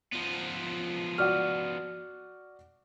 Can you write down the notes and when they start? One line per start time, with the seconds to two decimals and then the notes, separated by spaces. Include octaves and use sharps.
0.12 F3 B3
1.18 F#4 D5 F#5 F6